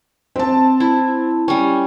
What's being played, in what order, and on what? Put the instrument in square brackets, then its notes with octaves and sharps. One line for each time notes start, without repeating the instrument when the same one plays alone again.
[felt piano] C4 A5
[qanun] E4
G3 C#4